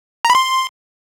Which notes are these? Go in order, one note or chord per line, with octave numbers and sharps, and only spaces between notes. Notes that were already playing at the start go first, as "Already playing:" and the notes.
A#5
B5
C6